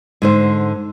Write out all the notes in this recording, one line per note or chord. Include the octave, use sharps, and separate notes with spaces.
G#2 D3 C5